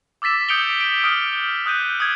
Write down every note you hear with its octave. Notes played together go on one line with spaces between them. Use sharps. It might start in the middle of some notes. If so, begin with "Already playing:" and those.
D6 E6 A6 B6 E7
D#6 G6 C#7 D7 F7 G7
D7 G7
D#6 F6 D7 G7
D#6 F#6 G6 D#7
D#6 G#6